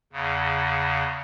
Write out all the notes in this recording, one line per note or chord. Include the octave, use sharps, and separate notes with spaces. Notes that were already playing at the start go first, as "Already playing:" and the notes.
E2 C#3